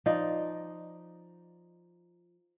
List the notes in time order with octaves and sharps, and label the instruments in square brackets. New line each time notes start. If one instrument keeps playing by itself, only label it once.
[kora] F3 D#4 D5